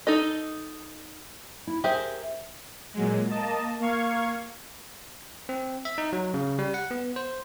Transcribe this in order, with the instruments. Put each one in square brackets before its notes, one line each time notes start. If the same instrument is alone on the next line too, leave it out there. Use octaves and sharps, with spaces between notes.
[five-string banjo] D#4 A4 D#5
[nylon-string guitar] E4
[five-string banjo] G4 G#4 C5 [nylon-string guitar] A#4 E5
[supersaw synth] A#2 F#3 G#3
A#3 D#5 A5
A#3 F5 C#6 G#6
[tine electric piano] C4
E5
D#4
F#3
C#3
G3
F#5
B3
C5